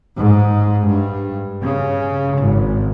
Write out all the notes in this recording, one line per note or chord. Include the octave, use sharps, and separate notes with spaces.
G#2
G2
C#3
G#1